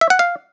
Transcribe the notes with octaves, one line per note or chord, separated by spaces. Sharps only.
E5
F#5
F5